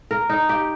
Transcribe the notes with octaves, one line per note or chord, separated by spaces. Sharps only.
A#4
D#4
G4